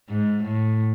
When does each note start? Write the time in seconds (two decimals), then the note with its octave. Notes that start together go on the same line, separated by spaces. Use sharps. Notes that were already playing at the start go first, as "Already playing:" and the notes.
0.09 G#2
0.44 A2